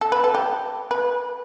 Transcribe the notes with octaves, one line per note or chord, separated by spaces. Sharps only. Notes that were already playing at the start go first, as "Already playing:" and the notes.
A4
B4
A4
G4
B4